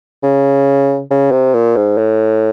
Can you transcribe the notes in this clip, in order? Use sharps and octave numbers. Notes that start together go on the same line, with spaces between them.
C#3
C#3
C3
A#2
G#2
A2